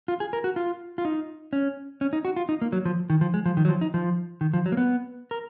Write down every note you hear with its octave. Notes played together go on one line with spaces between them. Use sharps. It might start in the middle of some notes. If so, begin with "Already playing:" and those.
F4
G#4
A#4
F#4
F4
F4
D#4
C#4
C#4
D#4
F#4
F4
D#4
A#3
F#3
F3
D#3
F3
G#3
F3
D#3
F#3
F3
D#4
F3
D#3
F3
F#3
A#3
B3
A#4